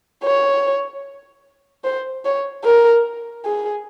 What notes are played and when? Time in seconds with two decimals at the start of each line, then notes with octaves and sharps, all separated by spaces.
0.23 C#5
1.84 C5
2.25 C#5
2.64 A#4
3.45 G#4